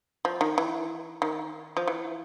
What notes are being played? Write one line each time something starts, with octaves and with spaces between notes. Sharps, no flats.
F3
D#3
E3
D#3
F3
E3